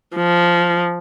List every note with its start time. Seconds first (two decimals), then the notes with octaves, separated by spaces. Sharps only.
0.16 F3